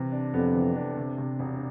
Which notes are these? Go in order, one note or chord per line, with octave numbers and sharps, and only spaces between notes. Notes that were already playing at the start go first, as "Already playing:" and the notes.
Already playing: C3 E3
D4
F2 B3
E3
D4
C3
C3
E1